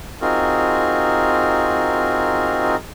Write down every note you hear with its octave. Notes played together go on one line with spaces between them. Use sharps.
C4 D#4 F4 F#4 G#4 A#4